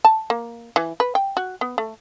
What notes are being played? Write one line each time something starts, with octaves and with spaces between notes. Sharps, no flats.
A5
A#3
E3
B4
G5
F#4
B3
A3